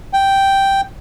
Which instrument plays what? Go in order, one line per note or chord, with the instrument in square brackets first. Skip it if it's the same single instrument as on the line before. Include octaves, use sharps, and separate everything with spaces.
[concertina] G5